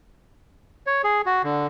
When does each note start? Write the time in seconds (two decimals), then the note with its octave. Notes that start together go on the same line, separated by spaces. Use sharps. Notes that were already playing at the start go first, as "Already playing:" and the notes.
0.87 C#5
1.04 G#4
1.26 F#4
1.44 D3